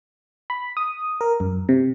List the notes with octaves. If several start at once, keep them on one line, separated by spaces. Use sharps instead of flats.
B5
D#6
A#4
F#2
C3